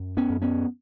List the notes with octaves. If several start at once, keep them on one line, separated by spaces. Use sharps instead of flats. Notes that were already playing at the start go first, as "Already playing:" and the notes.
Already playing: F#2
B3 C#4
F#2
B3 C#4